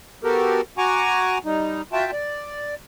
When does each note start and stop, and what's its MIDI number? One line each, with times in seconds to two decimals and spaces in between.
0.24 0.61 59
0.24 0.61 66
0.24 0.61 67
0.24 0.61 69
0.24 0.61 70
0.78 1.38 66
0.78 1.38 78
0.78 1.38 80
0.78 1.38 82
0.78 1.38 85
0.78 1.38 86
1.45 1.82 55
1.45 1.82 63
1.93 2.11 65
1.93 2.11 66
1.93 2.11 76
1.93 2.11 79
1.93 2.11 81
2.12 2.75 74